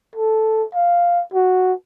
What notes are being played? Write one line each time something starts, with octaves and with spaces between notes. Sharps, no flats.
A4
F5
F#4